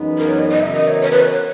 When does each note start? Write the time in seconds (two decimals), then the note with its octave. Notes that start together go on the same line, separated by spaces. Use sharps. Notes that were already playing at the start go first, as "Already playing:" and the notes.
Already playing: F#2 E3 G#3 B3 D#4
0.18 A#4
0.29 C#5
0.39 D#5
0.49 D#5
0.60 C#3 E3 B3 F#4 A#4 E5
0.74 D#5
0.88 C#5
1.01 C#5
1.11 B4
1.22 C#5
1.33 C#5